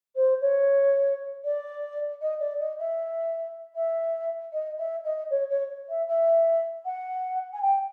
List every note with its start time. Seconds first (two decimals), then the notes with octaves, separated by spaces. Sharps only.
0.15 C5
0.41 C#5
1.44 D5
2.21 D#5
2.39 D5
2.59 D#5
2.78 E5
3.75 E5
4.52 D#5
4.78 E5
5.04 D#5
5.30 C#5
5.49 C#5
5.88 E5
6.08 E5
6.85 F#5
7.53 G#5
7.61 G5